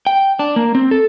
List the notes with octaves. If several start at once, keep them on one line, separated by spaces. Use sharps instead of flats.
G5
D4
A#3
C4
A4